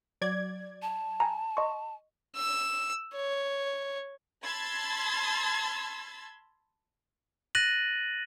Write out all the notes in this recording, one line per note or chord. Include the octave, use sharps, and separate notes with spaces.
F#3 D5 G#6
A5
G#5 A#5
D#5 C6 C#6
E6
C#5
A5 B5 C6 E6 G#6 A6
F#6 A6 A#6 D#7 F#7